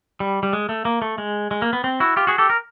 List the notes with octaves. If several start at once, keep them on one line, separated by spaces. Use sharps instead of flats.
G3
G3
G#3
A3
A#3
A3
G#3
G#3
A#3
B3
C4
E4 F#4
F4 G4
F#4 G#4
G4 A4
A#4